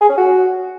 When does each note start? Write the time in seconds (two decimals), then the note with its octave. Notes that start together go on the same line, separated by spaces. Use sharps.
0.01 G#4
0.09 C#4
0.17 F#4